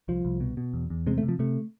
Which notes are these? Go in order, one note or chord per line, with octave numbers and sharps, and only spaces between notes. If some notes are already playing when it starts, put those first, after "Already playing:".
C2 F3
C2
B2
B2
E2
E2
C3 G#3
A3
C3
F3
C3 A3